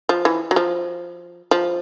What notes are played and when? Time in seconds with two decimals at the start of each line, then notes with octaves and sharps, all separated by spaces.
0.09 F3
0.25 E3
0.51 F#3
0.56 F3
1.51 F3